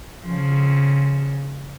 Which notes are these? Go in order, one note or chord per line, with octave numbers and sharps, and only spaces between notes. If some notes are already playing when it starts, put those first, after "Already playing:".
C#3 F3